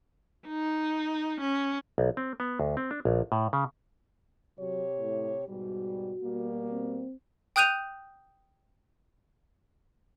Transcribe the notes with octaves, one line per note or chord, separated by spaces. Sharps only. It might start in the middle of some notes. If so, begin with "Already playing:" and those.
D#4
C#4
B1
C4
B3
D2
C4
D4
A#1
A2
C#3
C3 F#3 G4 C#5
A2
G#2 B2 G3 F#4
B2 G3 A#3
C4
G5 D#6 F#6 G6 D#7 F7